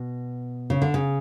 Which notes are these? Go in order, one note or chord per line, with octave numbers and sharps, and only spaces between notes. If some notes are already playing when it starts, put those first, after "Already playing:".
Already playing: B2
C#3
D3
C#3